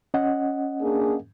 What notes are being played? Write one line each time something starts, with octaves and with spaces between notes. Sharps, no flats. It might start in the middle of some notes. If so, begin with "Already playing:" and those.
C#4 D#5 F#5
A#3 D4 G#4